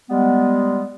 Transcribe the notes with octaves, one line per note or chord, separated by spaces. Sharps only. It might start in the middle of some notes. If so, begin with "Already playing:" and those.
G3 G#3 B3